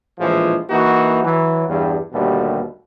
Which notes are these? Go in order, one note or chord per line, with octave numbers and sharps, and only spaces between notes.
A#1 A2 E3 F3 G#3
E3 A#3 D#4 F#4
E3 F#3
E2 G2
D#2 B2 D3 G3 A3